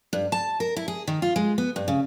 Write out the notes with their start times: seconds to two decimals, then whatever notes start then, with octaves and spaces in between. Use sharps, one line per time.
0.13 G2
0.32 A5
0.60 A#4
0.76 E4
0.88 G#4
1.07 D#3
1.22 F4
1.36 G#3
1.58 B3
1.76 G2
1.88 C#3